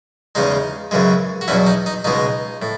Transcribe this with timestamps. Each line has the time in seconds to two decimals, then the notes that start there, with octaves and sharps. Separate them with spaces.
0.35 E2 C#3 G#3 D#4
0.91 F#2 C#3 E3 G#3
1.41 F#4
1.48 E2 B2 F#3 C#4 E4
1.67 D#4
1.86 D#4
2.04 C#2 B2 G#3 D#4
2.62 A2